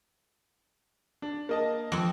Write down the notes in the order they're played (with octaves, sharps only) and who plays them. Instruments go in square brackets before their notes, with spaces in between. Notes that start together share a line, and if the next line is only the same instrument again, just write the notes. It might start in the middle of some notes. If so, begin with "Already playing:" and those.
[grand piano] D4
A#3 D#5 A5
[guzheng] F2 C4